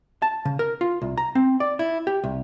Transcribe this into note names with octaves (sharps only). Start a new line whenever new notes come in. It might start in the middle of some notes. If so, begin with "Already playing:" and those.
A5
C#3
A#4
F4
C2
A#5
C4
D5
E4
G4
C2